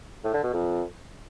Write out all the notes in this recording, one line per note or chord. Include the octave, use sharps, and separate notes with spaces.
A2
D3
B2
F2